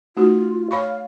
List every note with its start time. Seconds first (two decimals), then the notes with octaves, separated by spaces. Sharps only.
0.17 A3 D#4 F4 F#4
0.71 C#5 F5 B5 C#6